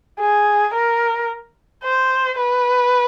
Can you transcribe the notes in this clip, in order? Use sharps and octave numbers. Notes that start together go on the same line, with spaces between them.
G#4
A#4
C5
B4